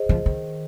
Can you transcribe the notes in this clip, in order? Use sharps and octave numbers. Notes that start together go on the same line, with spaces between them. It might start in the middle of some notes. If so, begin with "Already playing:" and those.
Already playing: G#4 C5 D#5
F3
D#3